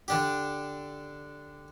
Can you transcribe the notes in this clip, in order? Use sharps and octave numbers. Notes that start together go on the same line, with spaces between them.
D3 D4 G4